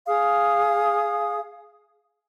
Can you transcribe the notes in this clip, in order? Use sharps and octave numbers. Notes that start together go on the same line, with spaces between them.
G#4 F5 D#6